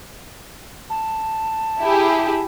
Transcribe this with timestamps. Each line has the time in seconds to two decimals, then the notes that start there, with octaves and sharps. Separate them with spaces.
0.90 A5
1.79 E4 G4 G#4